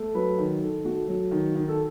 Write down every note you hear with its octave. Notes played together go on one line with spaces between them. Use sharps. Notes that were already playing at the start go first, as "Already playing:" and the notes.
Already playing: A3
F#3 B4
D#3
D#3 A4
A3 F#4
F#3
D#3
D#3
A4